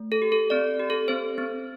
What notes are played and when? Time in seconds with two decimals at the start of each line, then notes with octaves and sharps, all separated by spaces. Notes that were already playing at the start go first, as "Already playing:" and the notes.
Already playing: A3
0.12 A4
0.22 G4
0.32 A4
0.50 C4 D5
0.79 G4
0.90 A4
1.08 C4 C5
1.38 C4